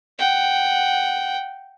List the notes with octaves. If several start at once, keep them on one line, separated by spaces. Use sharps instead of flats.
F#5 G5